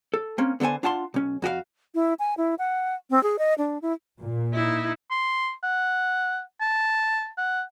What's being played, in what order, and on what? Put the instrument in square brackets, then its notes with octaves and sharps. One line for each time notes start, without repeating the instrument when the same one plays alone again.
[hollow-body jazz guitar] A4
A#3 C4 C#4
D3 B3 A4 C5 G#5
D4 F4 F#5 A5 B5 C6
B1 C#4
F2 F#4 G4 F5
[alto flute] E4
G#5
E4
F#5
C4
G#4
D#5
D4
E4
[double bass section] A#2
[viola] D#4 E4
[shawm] C6
F#5
A5
F#5